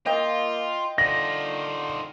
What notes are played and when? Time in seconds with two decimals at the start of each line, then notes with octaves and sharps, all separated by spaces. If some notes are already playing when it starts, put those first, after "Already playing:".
0.06 A#3 F4 D#5 G5
0.98 D3 D#3 F4 A#6